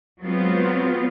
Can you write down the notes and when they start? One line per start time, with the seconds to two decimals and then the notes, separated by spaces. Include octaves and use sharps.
0.22 F#3 G#3 B3 C4 F4